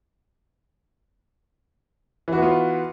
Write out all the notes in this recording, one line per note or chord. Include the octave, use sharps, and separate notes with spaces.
E3 B3 F4 F#4